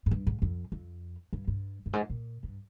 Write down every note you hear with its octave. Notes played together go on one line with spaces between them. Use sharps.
G#2
G2
G#2
F2
F2
G2
G2
G2
G#2
A#2
G2